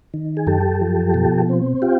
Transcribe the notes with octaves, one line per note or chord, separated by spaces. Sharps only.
D#3
G#4
F#2 G4 A4
F3
B2
C4
F4 G4